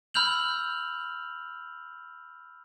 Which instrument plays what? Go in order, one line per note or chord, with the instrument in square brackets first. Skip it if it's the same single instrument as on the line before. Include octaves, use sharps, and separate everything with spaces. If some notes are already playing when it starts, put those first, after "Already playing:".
[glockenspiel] B5 E6 F6 G6 F7 F#7